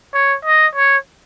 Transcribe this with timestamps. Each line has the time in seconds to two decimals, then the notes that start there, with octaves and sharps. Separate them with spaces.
0.14 C#5
0.45 D#5
0.75 C#5